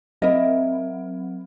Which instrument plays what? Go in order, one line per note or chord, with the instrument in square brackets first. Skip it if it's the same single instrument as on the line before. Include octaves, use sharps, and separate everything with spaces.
[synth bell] F#3 C4 [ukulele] A#4 D#5 E5